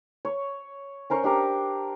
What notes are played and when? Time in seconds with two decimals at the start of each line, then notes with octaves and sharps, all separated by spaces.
0.25 C#5
1.10 C#4 A#4 C5 C#6
1.24 D4 G4 A#4